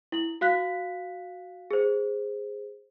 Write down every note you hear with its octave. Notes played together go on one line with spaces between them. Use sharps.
E4 F#7
F#4 F5 F#6 B6
G#4 C5